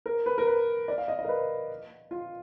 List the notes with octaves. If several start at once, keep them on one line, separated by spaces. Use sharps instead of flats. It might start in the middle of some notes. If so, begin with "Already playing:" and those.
A#4
B4
A#4
B4
D5
F5
D#5
D#5
A#4
B4
F4